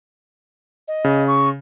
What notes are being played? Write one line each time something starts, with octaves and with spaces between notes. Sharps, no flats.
D#5
C#3
C#6